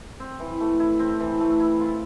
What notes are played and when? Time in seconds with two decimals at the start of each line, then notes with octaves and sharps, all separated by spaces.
0.20 C4
0.40 E3
0.60 A3
0.80 E4
0.99 C4
1.20 E3
1.40 A3
1.60 E4
1.80 F4